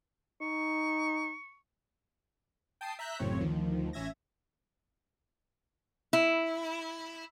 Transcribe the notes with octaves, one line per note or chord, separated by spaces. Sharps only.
D#4 C#6
G5 A5 D#6 C7
E5 A#5 F#6 G6 B6
A1 F#2 A2 C#3 C4 C#5
D2 D#3 F3
A1 C#4 E5 G#6 A#6
E4